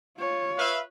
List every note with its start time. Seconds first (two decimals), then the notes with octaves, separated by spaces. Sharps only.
0.18 F4 C#5
0.58 B4 E5 F5